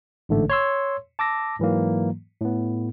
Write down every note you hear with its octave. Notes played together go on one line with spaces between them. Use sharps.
A1 G#2 D3 A3
C#5 C6 E6
A5 D6 E6 A#6
G#2 E3 F#3 A#3
A2 B3